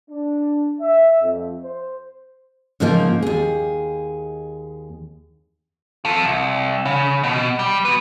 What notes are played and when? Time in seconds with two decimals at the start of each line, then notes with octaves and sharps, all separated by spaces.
0.10 D4
0.81 E5
1.21 F2
1.61 C5
2.80 G#2 C#3 F3 A#3 D#4
3.22 D#2 G#4
6.05 F4 A4
6.25 C2
6.85 C#3
7.23 B2
7.59 G3
7.85 F#4 B4